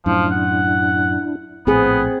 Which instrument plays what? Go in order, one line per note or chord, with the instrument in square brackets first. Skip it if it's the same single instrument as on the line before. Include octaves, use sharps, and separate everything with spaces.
[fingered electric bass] F#2 A2 [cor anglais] F3 [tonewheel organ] D4 E4
[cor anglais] F#5
[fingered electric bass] A#1 A2 [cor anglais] B3 [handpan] C4 G#4